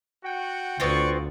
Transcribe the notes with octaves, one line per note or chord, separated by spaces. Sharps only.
F#4 F#5 G5
D2 B3 C4 F4 D5 C#6